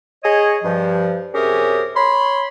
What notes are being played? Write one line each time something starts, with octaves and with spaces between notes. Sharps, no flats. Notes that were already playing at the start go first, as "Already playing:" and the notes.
G#4 C#5 D#5
G2 F3
F#2 C3 C#4 G4 G#4 A#4
C#5 B5 C6